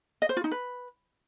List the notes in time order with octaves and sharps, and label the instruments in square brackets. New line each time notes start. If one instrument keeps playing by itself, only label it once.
[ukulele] D#5
C5
F4
D#4
B4